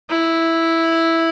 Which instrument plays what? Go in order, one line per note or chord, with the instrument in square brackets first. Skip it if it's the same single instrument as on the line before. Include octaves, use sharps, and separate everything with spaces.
[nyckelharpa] E4